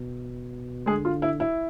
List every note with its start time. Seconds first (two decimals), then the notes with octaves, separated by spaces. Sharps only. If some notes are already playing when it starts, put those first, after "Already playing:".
Already playing: B2
0.86 D3 G#3 G#4
1.05 F4
1.22 E4
1.40 E4